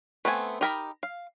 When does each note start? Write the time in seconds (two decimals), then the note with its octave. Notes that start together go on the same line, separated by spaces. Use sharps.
0.25 A3 B3 C4 D5 G#5
0.61 D#4 G4 A#4 A5 B5
1.03 F5